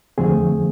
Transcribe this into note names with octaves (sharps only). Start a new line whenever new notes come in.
F2 D3 F3 A3 C4 G#4